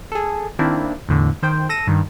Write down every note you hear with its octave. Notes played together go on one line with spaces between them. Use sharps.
G#4 A4
D#3 A#3 C4 D4 E4
E2 A2 D3
D#3 C5 G5
A4 A#6 D#7 E7
G2 D#3